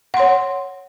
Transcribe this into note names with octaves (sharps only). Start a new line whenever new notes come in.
C#5 F#5 C6